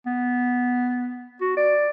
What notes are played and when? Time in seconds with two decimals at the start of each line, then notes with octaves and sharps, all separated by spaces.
0.06 B3
1.41 F#4
1.57 D5